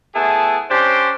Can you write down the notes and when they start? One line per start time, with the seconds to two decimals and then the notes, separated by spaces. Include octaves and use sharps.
0.15 A3 B3 E4 G#4 A5
0.70 C#4 D4 G4 C5